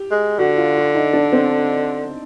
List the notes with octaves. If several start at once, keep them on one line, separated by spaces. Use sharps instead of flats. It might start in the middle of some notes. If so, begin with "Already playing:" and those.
Already playing: G4
G#3
D3 F#4
F4
F4
D#4
D4
C4